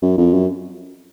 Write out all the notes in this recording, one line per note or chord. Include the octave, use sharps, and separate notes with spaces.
F#2
F2
F#2